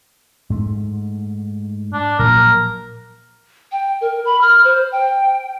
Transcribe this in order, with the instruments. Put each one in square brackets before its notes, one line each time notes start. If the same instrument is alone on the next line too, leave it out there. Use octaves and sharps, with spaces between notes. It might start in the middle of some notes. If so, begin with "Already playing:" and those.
[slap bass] G#2 A3
[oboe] D4
[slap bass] A#2 F3 F#3 [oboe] A#4
[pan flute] G5
A#4
B5
F6
C5
G5